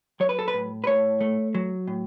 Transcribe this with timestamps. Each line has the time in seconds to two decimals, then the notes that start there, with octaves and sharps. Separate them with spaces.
0.20 F#3 C#5
0.29 B4
0.39 A4
0.48 B4
0.54 A2
0.84 B4
0.87 A2 C#5
1.21 A3
1.55 F#3
1.87 A2